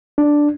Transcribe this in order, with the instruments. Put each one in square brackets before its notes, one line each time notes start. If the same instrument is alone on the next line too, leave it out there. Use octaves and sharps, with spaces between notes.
[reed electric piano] D4